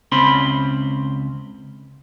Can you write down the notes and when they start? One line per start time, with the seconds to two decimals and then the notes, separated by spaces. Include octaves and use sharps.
0.12 C#2 C4 C#4 B5 C6